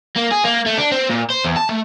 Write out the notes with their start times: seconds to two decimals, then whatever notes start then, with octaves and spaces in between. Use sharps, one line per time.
0.16 A#3
0.31 G#4
0.44 A#3
0.66 A3
0.78 D4
0.91 C4
1.10 A#2
1.30 C5
1.45 E2
1.57 A5
1.69 A3